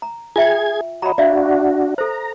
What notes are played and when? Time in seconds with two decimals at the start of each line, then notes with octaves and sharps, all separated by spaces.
0.02 A#5
0.36 F4 G#4 E5 G5 G#6
1.02 F#4 C#5 D#5 A#5 B5
1.18 D4 F#4 D5 E5 F5
1.98 A4 C5 A#5